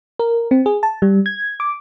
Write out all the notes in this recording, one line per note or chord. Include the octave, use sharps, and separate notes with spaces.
A#4
C4
G#4
A5
G3
G#6
D6